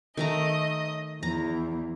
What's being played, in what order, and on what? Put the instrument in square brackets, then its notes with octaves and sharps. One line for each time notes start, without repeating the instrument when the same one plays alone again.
[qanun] D#3 A3 A#5 [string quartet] D#5
[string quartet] E2 [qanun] A#5